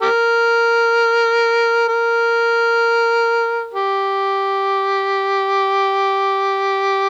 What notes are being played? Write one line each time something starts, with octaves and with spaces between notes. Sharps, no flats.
G4 A#4
A#4
G4